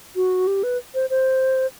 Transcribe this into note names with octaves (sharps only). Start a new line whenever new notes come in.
F#4
G4
B4
C5
C5